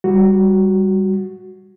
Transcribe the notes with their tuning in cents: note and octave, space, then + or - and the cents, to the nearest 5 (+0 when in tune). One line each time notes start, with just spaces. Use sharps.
G3 +5 F#4 +0